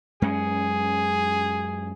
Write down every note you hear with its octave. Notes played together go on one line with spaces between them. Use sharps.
F#2 G#3 C#4 G#4